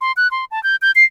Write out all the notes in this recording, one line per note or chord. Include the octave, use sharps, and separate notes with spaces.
C6
F#6
C6
A5
G6
G6
C7